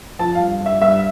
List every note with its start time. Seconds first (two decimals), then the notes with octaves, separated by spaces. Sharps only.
0.19 F3 A5
0.35 G2 F5
0.61 G2 E5
0.81 G2 E5